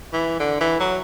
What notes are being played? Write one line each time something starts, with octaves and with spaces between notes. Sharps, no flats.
E3
D3
E3
F#3